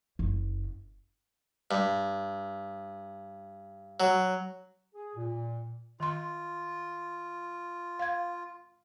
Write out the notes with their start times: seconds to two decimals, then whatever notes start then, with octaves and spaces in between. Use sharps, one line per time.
0.19 F#1
1.71 G2
4.00 F#3
4.94 G#4
5.16 A#2
6.00 D#3 F4 C6
7.99 F5 G#6